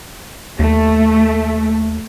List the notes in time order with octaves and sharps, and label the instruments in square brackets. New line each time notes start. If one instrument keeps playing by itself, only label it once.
[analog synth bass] D#2 [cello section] A3